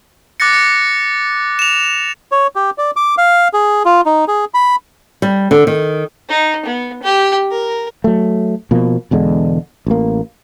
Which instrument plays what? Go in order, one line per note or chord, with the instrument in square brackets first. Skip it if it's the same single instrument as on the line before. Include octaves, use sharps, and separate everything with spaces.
[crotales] D6 F#6 A6 A#6 C#7
C#7
E7 F7
[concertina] C#5
G4
D5
D6
F5
G#4
F4
D#4
G#4
B5
[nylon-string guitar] G3
D3
D#3
[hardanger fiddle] D#4
B3
G4
A#4
[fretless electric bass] F#3 A3
B2 F3 A#3
E1 E2 D3 G#3
A1 A#3